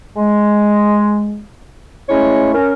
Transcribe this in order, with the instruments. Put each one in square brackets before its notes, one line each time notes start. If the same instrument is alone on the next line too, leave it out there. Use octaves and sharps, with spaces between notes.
[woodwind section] G#3
G#3 A3 C#4 E4 C#5
C#4 A#4